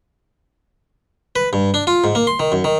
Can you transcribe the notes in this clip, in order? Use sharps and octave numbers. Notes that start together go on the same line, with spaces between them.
B4
G2
D4
F4
G#2
A#3
C6
D#3
F#2
D#3